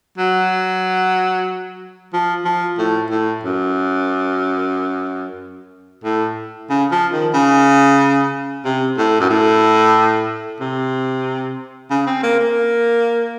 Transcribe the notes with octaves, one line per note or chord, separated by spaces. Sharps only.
F#3
F3
F3
A2
A2
F#2
A2
C#3
F3
D#3
C#3
C3
A2
F#2
A2
C3
C#3
C4
A#3
A#3